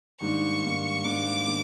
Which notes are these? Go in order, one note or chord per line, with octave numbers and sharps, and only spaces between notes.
G#2 D#3 G3 A#3 D4 C#6
G#2 D#3 G3 A#3 D4
G#2 D#3 G3 A#3 D4 D6
D#3 G3 A#3 D4